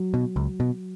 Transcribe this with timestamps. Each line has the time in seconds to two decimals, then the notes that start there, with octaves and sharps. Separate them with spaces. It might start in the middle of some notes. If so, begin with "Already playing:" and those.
Already playing: F#3
0.14 B2
0.36 C#2
0.60 B2